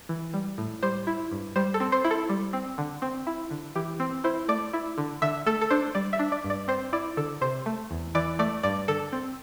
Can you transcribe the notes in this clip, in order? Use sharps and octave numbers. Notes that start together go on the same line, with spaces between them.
E3
G3
A2
G3 C5
E4
G2
G3 C5
A4
C4
C5
E4
A4
G3
C4
D3
C4
E4
D3
E3 G4
C4
E4 C5
A3 D5
E4
D3
D3 E5
A3 A4
A4
D4 C5
G3 D5
E5
D4
D5
G2
D5
C4 C5
E4 D5
D3 A4
C3 C5
A3
E2
E3 D5
A3 D5
G2 D5
D3 A4
C4